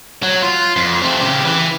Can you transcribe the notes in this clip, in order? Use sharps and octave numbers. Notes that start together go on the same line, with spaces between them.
F#3
F4
F2
A3 C4
C#3 G4
E3